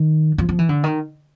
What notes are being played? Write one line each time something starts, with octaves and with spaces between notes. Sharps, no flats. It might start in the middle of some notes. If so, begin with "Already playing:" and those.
Already playing: D#3
F3
F3
E3
D3
D#3